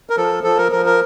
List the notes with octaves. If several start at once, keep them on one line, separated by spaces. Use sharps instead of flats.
A#4
F3 A4
F3 A4
A#4
F3 A#4
A#4